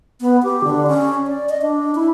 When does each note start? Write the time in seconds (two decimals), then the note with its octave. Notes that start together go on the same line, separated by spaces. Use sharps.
0.21 B3
0.43 G4
0.64 D3
0.87 C#4
1.27 D5
1.49 D#5
1.62 D4
1.95 E4